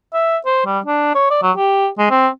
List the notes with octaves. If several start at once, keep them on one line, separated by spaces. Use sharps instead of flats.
E5
C5
G3
D4
C#5
D5
F#3
G4
G#3
C4